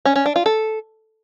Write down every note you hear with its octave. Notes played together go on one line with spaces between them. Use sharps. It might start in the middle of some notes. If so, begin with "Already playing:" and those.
C#4
C#4
D4
F4
A4